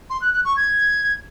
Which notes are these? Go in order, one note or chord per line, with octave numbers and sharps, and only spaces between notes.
C6
F#6
F#6
C#6
G#6